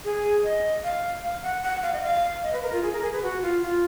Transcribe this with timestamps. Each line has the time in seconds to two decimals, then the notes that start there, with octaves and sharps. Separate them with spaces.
0.04 G#4
0.44 D#5
0.84 F5
1.23 F5
1.43 F#5
1.63 F#5
1.83 F5
1.93 D#5
2.03 F5
2.43 D#5
2.53 B4
2.63 A#4
2.73 F4
2.83 G#4
2.93 A#4
3.02 G#4
3.13 B4
3.23 F#4
3.42 F4
3.62 F4